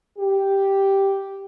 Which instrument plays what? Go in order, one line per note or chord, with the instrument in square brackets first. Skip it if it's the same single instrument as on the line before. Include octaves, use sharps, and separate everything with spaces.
[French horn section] G4